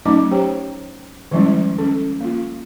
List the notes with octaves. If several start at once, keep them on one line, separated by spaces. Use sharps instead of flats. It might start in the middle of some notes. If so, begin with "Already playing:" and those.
F#3 A3 C#4 D#4 D#5 D6
G4 C5 C#5 G5 A#5
D#3 F3 G3 G#3 C#4 E4
C#4 A4
A#3 F4